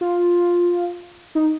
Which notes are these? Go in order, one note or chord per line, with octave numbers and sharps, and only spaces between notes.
F4
D#4